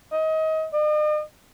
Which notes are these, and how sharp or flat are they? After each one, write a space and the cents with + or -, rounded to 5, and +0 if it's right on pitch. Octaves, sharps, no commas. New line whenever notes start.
D#5 +25
D#5 -45